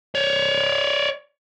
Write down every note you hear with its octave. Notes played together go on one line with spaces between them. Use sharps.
C#5 D5